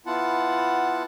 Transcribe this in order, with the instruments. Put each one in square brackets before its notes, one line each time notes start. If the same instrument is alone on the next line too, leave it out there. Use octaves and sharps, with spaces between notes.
[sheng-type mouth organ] B3 E4 F4 F#5 A5